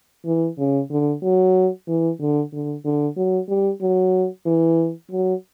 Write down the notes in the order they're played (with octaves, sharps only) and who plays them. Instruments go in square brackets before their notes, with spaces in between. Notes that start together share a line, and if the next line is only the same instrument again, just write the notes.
[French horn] E3
C#3
D3
F#3
E3
D3
D3
D3
F#3
G3
F#3
E3
F#3